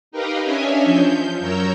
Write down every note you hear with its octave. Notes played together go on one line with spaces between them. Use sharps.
D#4 G4 A#4 B4 D#5 F5
C#4 D4 C#5 D#5 E5 G#5
F3 G6
F#2 A#4 C#5 A#5 E6 G6